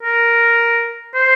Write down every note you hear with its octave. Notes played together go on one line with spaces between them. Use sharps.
A#4
C5